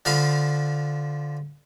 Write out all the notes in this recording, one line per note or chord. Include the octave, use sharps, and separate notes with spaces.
D3 F3 C5 F5 B5